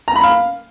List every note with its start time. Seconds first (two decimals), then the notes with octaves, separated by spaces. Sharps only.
0.08 A#5
0.16 B5
0.23 F5